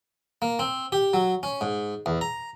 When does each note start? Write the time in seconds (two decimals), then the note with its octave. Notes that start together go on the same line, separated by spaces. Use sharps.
0.42 A#3
0.59 C4
0.92 G4
1.14 F#3
1.43 C#4
1.61 G#2
2.06 E2
2.21 A#5